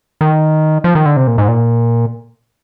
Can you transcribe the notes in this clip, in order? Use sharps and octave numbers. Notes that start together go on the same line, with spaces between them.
D#3
F3
D#3
D3
C3
A#2
G#2
A#2